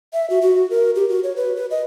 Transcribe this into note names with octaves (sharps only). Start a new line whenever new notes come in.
E5
F#4
F#4
A#4
G4
F#4
C#5
B4
B4
D#5